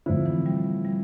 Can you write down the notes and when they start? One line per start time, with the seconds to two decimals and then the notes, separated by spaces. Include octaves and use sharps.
0.06 A2 D3 F3 C4 E4
0.26 E3
0.46 G3
0.85 G3